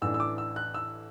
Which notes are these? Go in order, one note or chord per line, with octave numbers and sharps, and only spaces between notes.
A1 A2 E3 D4 E6
E6
D6
E6
F#6
E6